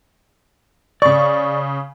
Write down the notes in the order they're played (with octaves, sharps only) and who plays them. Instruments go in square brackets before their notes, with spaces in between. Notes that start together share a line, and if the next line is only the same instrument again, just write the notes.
[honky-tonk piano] C#3 C#6 [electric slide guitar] D5